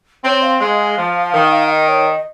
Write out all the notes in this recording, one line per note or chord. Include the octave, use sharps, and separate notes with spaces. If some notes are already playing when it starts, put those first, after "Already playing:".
C4 C#5
F5
G#3 F5
F3
D#3
D#5
C#5
D#5